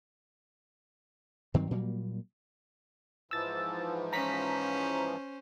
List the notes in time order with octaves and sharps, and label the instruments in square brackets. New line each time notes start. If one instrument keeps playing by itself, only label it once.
[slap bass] G2 D#3 F#3 C4
A#2 F#3 G3 A#3
[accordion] G#2 E3 F3 [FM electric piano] E6 A6
[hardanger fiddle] C#4 C5 [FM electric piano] A#5 B6